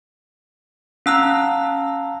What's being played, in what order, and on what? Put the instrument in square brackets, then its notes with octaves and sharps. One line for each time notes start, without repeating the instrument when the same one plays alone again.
[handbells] C#4 E6 F#6 [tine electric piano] F5 A5 A#5